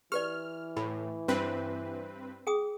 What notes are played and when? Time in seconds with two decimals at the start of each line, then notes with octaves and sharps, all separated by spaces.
0.12 E3 G4 B4 D5 F6
0.77 A2 B5
1.28 G2 C4 B4
2.47 G#4 G5 D#6